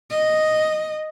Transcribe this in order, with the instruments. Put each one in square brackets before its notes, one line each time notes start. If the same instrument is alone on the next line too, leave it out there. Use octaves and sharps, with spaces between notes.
[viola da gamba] D#5